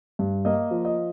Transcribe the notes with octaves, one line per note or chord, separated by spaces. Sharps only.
G2
A#3 D#5
F3
D#5